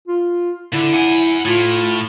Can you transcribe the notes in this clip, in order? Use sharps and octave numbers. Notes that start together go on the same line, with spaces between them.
F4
D3 E4
F#5 G#5
A2 F4